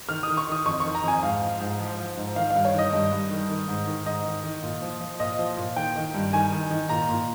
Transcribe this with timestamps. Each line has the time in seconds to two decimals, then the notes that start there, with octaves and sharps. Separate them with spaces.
0.09 D#3 F6
0.23 D#3 D#6
0.37 C#6
0.47 D#3 D#6
0.66 F2 C#6
0.80 D#3 C#6
0.95 A#5
1.04 F2 G#5
1.23 G#2 F5
1.41 F3
1.60 G#2
1.79 F3
1.99 F3
2.17 G#2
2.35 D#3 F5
2.50 G2 F5
2.65 C#5
2.74 D#3 D#5
2.93 G2
3.12 G2
3.31 D#3
3.49 D#3
3.68 G#2
3.87 D#3
4.06 G#2 D#5
4.25 D#3
4.44 D#3
4.63 A#2
4.82 F3
5.01 F3
5.20 A#2 D#5
5.39 F3
5.57 A#2
5.76 D#3 G5
5.95 D#3
6.14 G2
6.33 D#3 G#5
6.52 D#3
6.71 D#3
6.89 A#2 A#5
7.09 A#2